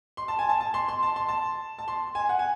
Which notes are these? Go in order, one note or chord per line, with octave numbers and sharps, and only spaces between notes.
C6
A5
G#5
A5
A5
C6
C6
A5
C6
A5
A5
C6
G#5
F#5
G#5